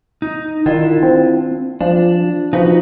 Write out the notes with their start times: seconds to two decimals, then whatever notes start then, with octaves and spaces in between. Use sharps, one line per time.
0.22 D#4
0.66 D#3 D4 E4 F4
1.03 C4
1.81 F3 D4
2.53 F3 D#4 F#4 B4